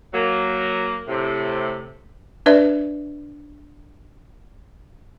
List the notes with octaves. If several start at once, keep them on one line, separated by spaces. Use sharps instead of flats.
F#3 A#3
A2 C3
D4 B4 D5 E5